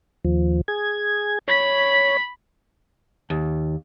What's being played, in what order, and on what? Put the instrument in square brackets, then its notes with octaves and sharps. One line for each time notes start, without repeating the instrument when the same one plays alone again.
[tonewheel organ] D#2 F3
G#4 G#6
[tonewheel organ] C#5 [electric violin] B5 B6
[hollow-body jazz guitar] D#2